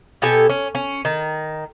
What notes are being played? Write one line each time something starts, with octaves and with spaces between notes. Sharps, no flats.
B2 G4 A4 G#5
C#4
C#4
D#3